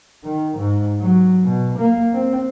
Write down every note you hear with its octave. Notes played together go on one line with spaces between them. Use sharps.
D#3
G#2
F#3
B2
A#3
C4